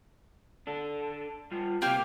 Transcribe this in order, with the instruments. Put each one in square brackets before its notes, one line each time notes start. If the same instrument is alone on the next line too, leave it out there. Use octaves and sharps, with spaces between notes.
[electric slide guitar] D4 A4
G3 F4
[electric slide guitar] C3 C4 [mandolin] A#3 G4 F6 [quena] G5